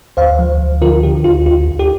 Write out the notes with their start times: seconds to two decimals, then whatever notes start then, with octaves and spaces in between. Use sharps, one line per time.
0.17 D2 C5 F5
0.39 F3
0.60 D2
0.81 D3 F4 A#4
1.03 D3 G4
1.24 D2 F4
1.46 D2 F4
1.67 D2
1.79 G4